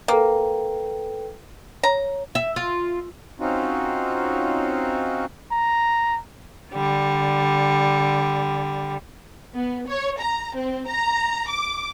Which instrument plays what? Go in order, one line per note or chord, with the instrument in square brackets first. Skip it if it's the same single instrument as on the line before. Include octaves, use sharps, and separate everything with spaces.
[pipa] A#3 [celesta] A4 B4 G5
[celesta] C#5 [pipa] A#5
[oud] E5
F4
[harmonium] C4 C#4 D#4 F4 F#4
[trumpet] A#5
[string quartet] D3 G3
[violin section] B3
C#5
A#5
C4
A#5
D6